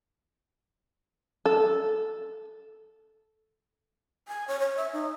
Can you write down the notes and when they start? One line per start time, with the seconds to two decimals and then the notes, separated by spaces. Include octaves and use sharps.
1.46 A4
4.28 G#5
4.48 C#5
4.60 C#5
4.77 E5
4.93 D#4